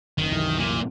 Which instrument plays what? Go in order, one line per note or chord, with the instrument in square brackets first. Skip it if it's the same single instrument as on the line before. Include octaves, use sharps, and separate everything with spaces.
[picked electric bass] F#1 [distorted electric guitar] D#3
[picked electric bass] C2 F#2 E3
[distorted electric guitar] A#2